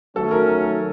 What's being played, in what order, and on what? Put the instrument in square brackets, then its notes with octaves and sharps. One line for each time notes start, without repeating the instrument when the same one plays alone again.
[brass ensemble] D#3 F#3 A3 C#4 [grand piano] A4
[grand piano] A#4